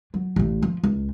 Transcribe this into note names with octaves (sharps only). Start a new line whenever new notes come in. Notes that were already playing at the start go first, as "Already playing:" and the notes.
F#3
A1 A2
F3
C#2